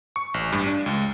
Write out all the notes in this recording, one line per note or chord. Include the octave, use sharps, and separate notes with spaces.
C#6
A1
G2
D4
C#2